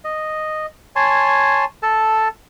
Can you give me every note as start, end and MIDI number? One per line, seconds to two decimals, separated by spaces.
0.04 0.66 75
0.96 1.65 73
0.96 1.65 80
0.96 1.65 81
0.96 1.65 84
1.83 2.28 69
1.83 2.28 81